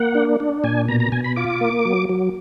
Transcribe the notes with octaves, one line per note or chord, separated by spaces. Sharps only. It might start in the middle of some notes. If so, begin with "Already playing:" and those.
Already playing: A#3 F#5
D4
D4
A#2 G#5
B2 A#5
A#5
B2 G#5
B5
F4 D6
A#3
F#3
F#3